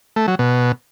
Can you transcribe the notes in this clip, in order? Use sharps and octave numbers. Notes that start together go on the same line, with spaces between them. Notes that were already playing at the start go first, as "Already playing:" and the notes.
A3
F#3
B2